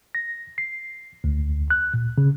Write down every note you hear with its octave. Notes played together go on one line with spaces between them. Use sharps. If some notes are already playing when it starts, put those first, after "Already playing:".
A#6
C7
D2
F#6
A#2
C#3